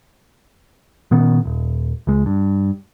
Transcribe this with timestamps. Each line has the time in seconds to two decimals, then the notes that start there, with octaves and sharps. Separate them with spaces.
1.11 A#2 D#3 B3 C#4
1.45 D#1
2.07 C#2 G#3
2.26 G2